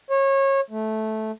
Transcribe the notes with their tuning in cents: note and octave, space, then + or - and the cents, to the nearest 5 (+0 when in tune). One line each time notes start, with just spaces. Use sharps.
C#5 -25
A3 -10